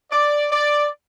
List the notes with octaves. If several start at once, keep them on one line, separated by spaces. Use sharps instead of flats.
D5
D5